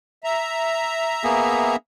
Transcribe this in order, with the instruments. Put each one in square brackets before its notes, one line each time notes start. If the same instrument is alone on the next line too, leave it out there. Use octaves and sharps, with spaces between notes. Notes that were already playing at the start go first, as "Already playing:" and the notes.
[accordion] E5 A#5
[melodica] A#3 B3 G#4